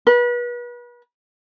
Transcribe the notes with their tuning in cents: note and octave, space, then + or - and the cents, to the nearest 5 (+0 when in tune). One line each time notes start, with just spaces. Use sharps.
B4 -35